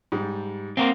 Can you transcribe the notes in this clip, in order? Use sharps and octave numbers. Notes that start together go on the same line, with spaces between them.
G#2 G3
A#3 C4 F5 F#5 C6